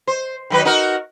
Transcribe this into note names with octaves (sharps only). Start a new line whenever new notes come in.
C5
D#3 F#3 B4
D#4 F#4 A#4